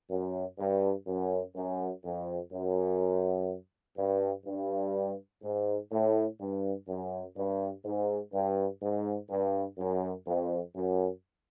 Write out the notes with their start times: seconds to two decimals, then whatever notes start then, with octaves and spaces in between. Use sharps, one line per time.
0.10 F#2
0.59 G2
1.07 F#2
1.55 F#2
2.04 F2
2.52 F#2
3.98 G2
4.46 G2
5.43 G#2
5.91 A2
6.39 G2
6.88 F#2
7.37 G2
7.85 G#2
8.33 G2
8.81 G#2
9.30 G2
9.78 F#2
10.26 F2
10.75 F#2